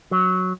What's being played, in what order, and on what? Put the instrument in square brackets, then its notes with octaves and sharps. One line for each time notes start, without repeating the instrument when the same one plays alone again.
[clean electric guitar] F#3